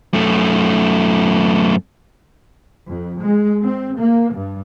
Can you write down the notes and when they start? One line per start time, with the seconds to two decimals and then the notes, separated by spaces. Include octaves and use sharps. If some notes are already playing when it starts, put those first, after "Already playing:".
0.14 F#2 A3
2.87 F2
3.20 G#3
3.62 C4
3.97 A#3
4.33 G2